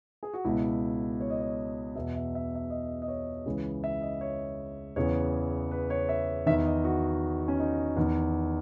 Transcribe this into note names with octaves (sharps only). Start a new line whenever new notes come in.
G#4
F#4
C#2 B2 E4
C#5
D#5
C#5
E2 B2 E5
E5
E5
E5
D#5
D#5
C#5
C#2 C#3 E3
E5
D#5
C#5
E2 C#3 E3 C#5
B4
C#5
E5
E2 D#3 E5
D#5
F#4
C#4
D#4
E2 D#3